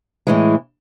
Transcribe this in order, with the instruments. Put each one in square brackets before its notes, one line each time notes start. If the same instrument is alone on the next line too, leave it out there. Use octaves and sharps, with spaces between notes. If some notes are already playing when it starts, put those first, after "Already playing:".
[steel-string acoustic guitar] A2 E3 G#3